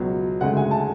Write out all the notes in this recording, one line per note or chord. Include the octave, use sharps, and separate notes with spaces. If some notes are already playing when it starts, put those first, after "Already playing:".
Already playing: C#2 B2 F#3 B3
D2 C#3 G#3 F#5
G#5
A5